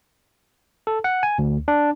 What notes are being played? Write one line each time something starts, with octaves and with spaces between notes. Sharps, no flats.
A4
F#5
G#5
D2
D4